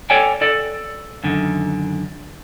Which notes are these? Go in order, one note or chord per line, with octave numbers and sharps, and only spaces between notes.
A4 C#5 D5 G5 G#5
A4 D5
F#2 D3 D#3